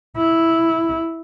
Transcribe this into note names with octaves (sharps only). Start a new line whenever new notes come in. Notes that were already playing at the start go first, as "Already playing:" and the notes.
E4